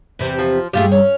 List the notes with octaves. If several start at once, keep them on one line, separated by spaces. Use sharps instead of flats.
E2 C3
F3
G2 A3 F4 G4 G#4
C#4